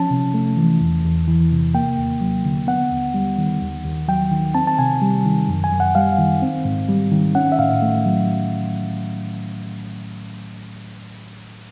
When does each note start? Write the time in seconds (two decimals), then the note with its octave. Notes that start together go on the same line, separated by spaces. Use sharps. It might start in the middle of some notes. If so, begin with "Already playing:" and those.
Already playing: F3 C#4 A5
0.11 C3
0.34 A3
0.57 E3
0.81 E2
1.04 E2
1.28 E3
1.51 C3
1.74 A#3 G5
1.98 D#2
2.21 F#3
2.44 D3
2.67 B3 F#5
2.91 D#2
3.14 G3
3.38 D#3
3.61 D#2
3.85 D#2
4.08 F#3 G5
4.31 D#3
4.55 C4 A5
4.67 A5
4.79 C3 G#5
5.01 G3
5.25 D#3
5.48 F#2
5.64 G#5
5.72 F#2
5.80 F#5
5.95 G3 F5
6.18 D#3
6.42 C4
6.65 G#2
6.89 G3
7.12 D#3
7.35 C#4 F#5
7.52 E5
7.59 A2 F5
7.82 A3
8.05 F#3